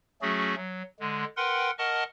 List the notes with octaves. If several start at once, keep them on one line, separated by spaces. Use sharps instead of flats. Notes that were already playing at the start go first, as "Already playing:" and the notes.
F#3 A3 C#4 F#4 G#4
F#3
D3 G#3
A#4 B4 F#5 G5 C6
A#4 D#5 F#5 A5 C#6 F6